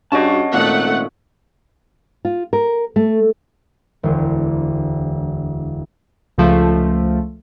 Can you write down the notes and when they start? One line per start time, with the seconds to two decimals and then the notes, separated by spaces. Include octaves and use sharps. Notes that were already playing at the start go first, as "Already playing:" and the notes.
0.12 G2 C#4 F#4 G#4 D#5 A5
0.53 G#1 A#2 A3 F#5
2.25 F4
2.53 A#4
2.96 A3
4.03 E1 D2
6.38 C#2 F3 A3